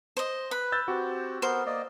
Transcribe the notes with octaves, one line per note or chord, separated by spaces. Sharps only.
C5 D#5
B4 B5
E6 G6 A6
C4 F#4 G4
B3 A#4 C5
A#3 D5 D#5